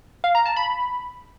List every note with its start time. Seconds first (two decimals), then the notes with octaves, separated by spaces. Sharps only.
0.24 F5
0.35 A#5
0.46 A5
0.56 B5